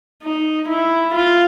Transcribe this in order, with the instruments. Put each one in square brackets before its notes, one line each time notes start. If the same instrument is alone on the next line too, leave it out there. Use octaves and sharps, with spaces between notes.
[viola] D#4
E4
F4